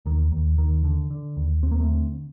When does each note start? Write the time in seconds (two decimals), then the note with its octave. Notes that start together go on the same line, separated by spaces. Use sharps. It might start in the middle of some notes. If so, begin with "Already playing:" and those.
0.06 D#2 D#3
0.32 D#2
0.58 D#2 D#3
0.84 D3
1.10 D3
1.37 D#2
1.63 D#2 C4
1.71 A#3
1.80 A3 C4
1.89 D3